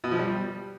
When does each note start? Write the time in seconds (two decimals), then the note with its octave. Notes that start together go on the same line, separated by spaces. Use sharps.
0.04 B2
0.11 F3
0.19 G3